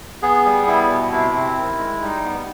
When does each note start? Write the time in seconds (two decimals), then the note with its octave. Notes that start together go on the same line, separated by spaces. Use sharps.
0.23 B3 G#4
0.45 G3
0.67 B3 E4
0.90 B2
1.12 C3 E4
1.34 C4
1.58 D#3
1.79 G#3
2.02 G3 D#4
2.25 B3